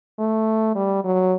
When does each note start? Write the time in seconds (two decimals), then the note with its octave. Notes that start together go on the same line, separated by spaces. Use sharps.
0.19 A3
0.76 G3
1.05 F#3